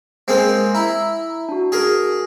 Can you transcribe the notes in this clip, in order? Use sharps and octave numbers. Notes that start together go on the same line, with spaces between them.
G#3 A#3 C4 C5
E4 A#5
D4 F#4
G#4 A#4